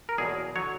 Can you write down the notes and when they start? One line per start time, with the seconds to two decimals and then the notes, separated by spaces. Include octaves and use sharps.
0.09 A#4
0.18 E2 B2 F#3 A#3 G#4
0.56 D3 F#3 C#5